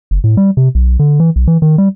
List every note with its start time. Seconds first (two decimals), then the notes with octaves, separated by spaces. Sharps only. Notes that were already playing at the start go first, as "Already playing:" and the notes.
0.11 F#1
0.24 A2
0.37 G3
0.57 C3
0.75 B1
0.99 D3
1.20 E3
1.36 B1
1.47 E3
1.62 D#3
1.78 G3